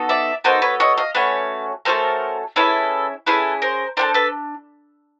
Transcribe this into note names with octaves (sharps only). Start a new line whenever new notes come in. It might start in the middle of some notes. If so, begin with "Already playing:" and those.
Already playing: B3 D#4 F#4 A4
D5 E5
B3 D#4 F#4 A4 A#4 C5
B4 C#5
C#5 D#5
D#5 F5
A3 C#4 F#4 B4 C#5
A3 C#4 F#4 A4 A#4 C5
C#4 E4 G#4 A4 B4
C#4 E4 G#4 A4 B4
A#4 C5
D4 F#4 A4 A#4 C5
A4 B4